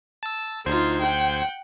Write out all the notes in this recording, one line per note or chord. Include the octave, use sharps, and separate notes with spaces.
A5 E6
D2 D#4 F4 C5 G#6
F#5 G5